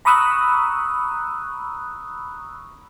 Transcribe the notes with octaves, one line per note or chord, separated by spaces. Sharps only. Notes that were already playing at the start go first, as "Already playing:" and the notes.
A#5 B5 C#6 D#6 E6 F#6